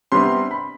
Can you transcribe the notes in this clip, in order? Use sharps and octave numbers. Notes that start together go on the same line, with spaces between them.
C3 G3 B3 D4 C6
B5